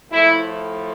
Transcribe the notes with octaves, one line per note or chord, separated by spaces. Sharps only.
A2 F3 A3 E4